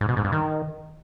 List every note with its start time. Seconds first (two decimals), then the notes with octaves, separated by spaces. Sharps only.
0.01 G#2
0.09 B2
0.17 G#2
0.24 G2
0.32 D#3